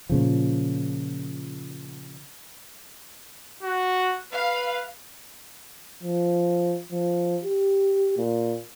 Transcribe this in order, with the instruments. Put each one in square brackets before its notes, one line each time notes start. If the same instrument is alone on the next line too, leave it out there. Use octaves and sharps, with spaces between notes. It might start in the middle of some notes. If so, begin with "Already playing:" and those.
[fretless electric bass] A#2 C#3 F3
[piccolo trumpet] F#4
[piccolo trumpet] B4 [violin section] F5
[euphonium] F3
F3
G4
A#2